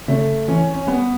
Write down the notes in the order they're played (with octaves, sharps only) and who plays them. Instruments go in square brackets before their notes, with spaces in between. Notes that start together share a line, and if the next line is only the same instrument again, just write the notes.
[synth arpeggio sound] C#3 [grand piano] A3
[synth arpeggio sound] E3 [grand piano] C#4
[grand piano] C#4
[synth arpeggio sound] G3 [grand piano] B3